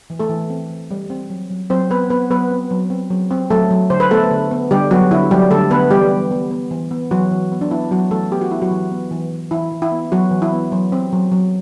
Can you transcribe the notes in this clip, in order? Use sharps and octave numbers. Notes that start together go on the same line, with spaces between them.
E3
A3 A4
E3
C4
E3
G3
C4
F#3
F#3
F#3 C4 C5
B3 C4 B4
B3 C4 B4
F#3 B3 B4
C4
F#3
C4
F#3
C4
F#3 A3 A4
F#3
D3 C5
B4
A3 B3 A4
D3
B3
D3 G3 G4
F#3 B3 F#4
D3 E4
F#3 G3 G4
D3 A3 A4
D3 B3 B4
E3 G3 G4
B3
B3
B3
E3
B3
E3 F#3 F#4
E3
B3
D4
B3 E4
F#3 B3 F#4
E3 A3 A4
B3 G4
F#4
B3 E4
F#3 F#4
E3
B3
E3
E3
E3 E4
E3
E4
B3
F#3 B3 F#4
E3
E4
B3
F#3
C4
F#3
F#3